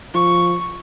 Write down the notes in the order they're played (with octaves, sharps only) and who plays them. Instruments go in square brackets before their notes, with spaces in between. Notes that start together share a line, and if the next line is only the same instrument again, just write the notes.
[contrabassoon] F3 [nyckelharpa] C#6